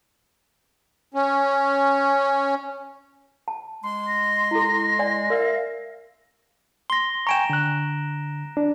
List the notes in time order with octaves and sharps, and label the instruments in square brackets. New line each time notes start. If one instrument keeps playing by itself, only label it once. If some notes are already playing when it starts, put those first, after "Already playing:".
[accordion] C#4
[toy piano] A5
[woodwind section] G#3 C6
[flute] A#6
[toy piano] E4 A4
D5 G#5
[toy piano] A#4 D5 [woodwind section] E5 F5
[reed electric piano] C6 [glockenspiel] A#6 G7
[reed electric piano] G5 G#5 C#6 [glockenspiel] A#5 D7 E7
[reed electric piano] D3 F#6
D4